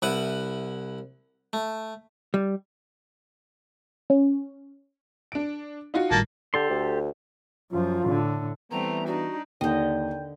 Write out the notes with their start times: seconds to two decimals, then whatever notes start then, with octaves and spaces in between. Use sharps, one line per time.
0.02 C2 E4 B4 F#5
1.53 A3
2.34 G3
4.10 C#4
5.32 D4 D7
5.94 D#4 F4 F#4
6.11 G#1 A2 G3 A#3 A5
6.54 D3 G4 A4 C6
6.70 D2
7.72 F#2 F3 F4
8.07 A2 D3
8.71 E3 G3 A3 B3 C4 A#5
9.06 D4 D#4 F#4
9.61 D#2 D3 D#5 G5 G6